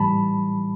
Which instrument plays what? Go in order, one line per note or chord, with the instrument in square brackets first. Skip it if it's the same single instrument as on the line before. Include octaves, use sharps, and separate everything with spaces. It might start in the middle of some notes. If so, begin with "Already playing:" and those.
Already playing: [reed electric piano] A2 E3 G3 A5 B5